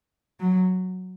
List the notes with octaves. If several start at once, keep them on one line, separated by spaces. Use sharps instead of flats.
F#3